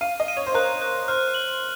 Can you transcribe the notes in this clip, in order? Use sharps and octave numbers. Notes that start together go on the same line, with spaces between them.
F5 D#7
D#5
D#7
C#5
C5
A#4 F#6
F#6
C5 F6
F#7